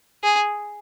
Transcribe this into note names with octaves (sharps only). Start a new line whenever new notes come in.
G#4